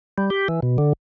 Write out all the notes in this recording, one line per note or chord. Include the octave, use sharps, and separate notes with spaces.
G3
G4
E3
B2
D3